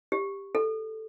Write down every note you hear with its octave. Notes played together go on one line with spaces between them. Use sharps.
G4
A4